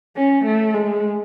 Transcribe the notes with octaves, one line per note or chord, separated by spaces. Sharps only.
C#4
A3
G#3